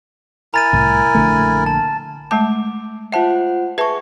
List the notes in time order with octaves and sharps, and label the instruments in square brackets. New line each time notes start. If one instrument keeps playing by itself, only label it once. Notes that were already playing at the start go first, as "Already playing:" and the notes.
[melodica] E4 A#4 G#5 [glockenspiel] A#5 A6 D#7
[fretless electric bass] C2 A2
A#1 D3 A3
[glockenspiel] A5
[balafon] G#3 A3 A5 [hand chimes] D6
[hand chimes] F4 C5 F#5 [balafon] E5 A5
[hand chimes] G#4 C#6 [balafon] B4 E5 A5